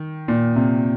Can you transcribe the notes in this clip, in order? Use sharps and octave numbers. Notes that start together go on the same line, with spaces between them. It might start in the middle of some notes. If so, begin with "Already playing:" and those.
Already playing: D#3
A#2
C3